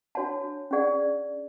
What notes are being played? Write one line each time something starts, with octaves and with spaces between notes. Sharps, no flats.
D4 F#4 C#5 F#5 A5
C#4 G#4 D5 F#5